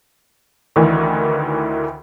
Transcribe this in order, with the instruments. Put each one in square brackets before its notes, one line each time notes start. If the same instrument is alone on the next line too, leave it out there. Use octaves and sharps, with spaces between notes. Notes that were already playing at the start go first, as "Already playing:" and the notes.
[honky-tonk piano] D2 D#3 E3